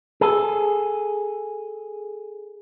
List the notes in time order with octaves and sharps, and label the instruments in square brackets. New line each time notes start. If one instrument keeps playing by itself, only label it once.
[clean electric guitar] G#4 A4